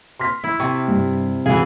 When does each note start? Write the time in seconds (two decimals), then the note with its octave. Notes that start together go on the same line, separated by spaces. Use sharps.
0.19 C6 F6 B6
0.44 E4
0.60 C3 C#6
0.88 G2
1.46 G#1 C#3 E3 G#4 F5